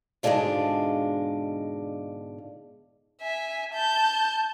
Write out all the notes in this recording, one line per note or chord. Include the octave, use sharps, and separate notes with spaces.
G#2 B2 D3 G#3 D4 F4
E5 G#5
A5 G6